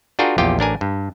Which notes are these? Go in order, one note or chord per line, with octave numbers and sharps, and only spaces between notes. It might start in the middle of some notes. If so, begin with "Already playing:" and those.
D4 F4 F#4 G#4 A#4 G5
A#1 E2 F4 G4 G5
A1 D4 A#4 G#5
G2